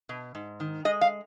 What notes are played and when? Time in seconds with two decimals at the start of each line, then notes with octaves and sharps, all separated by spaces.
0.09 B2
0.35 G#2
0.60 D#3
0.85 G#3 D#5
1.01 F5